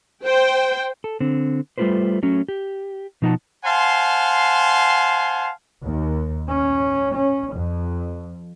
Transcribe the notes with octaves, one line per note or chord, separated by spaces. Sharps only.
C5 G5
A4
D3 C4
G3 A3 F4 G4 B4 C5
F#3 A3 C#4
G4
B2 F3 D#4 F4 F#5 A5
C5 F5 F#5 G#5 A5 C6
D#2
C#4
C#4
F2